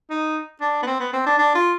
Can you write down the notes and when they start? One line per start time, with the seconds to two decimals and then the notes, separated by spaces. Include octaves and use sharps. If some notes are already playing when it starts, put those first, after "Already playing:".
0.10 D#4
0.61 D4
0.83 B3
0.87 C4
1.00 B3
1.13 C4
1.26 D4
1.38 D4
1.55 F4